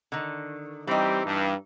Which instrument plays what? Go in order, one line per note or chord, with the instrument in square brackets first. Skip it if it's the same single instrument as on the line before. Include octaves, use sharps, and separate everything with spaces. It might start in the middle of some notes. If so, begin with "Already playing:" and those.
[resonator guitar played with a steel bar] D3 D#3
[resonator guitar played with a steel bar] E3 D#4 [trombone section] G3 C4 G4
[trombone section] G2